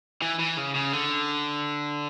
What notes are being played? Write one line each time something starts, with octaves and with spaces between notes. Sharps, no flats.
E3
E3
C#3
C#3
D3